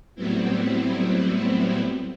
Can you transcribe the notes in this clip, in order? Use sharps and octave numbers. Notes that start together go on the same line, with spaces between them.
A2 F#3 G3 B3 C4 E4